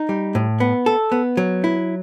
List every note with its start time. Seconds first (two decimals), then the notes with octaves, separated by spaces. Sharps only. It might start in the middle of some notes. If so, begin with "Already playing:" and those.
Already playing: D#4
0.09 G3
0.35 A2
0.60 B3
0.86 A4
1.12 B3
1.37 F#3
1.64 E4